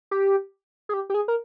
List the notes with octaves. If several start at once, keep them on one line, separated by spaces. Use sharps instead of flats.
G4
G#4
G4
G4
G#4
A#4